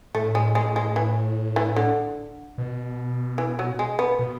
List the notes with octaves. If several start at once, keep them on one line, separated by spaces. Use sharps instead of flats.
A2 A3
G#3
G#3
G#3
E3
E3
D3
B2
E3
F#3
G#3
B3
B2